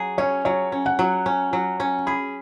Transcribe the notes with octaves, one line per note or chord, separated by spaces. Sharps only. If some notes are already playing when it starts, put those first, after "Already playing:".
Already playing: F#3 G#4
C#4 C#5
F#3 C#5
C#4
F#5
F#3
C#4
F#3
C#4
G#4 B5